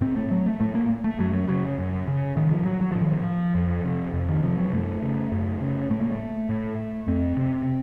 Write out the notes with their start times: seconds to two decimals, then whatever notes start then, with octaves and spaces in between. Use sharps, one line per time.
0.01 A2 C4
0.16 A3
0.31 F#3
0.46 A3
0.60 A2 A3
0.75 A#3
1.04 A3
1.19 F#2 F#3
1.33 F#3
1.48 C#3 F#3
1.79 F#2
2.08 C#3
2.37 A2 D#3
2.51 F3
2.66 F#3
2.81 F#3
2.92 A2 F3
3.01 D#3
3.12 F3
3.55 F2
3.84 C3
4.13 F2
4.29 D#3
4.43 C3 F3
4.58 F#3
4.73 F#2 A3
5.02 C#3
5.32 F#2
5.60 C#3
5.90 A2 A3
6.01 A#3
6.11 A3
6.49 A2
7.07 F2 C4
7.37 C3